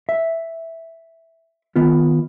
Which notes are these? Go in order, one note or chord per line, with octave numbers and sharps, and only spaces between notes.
E5
D#3 B3 F4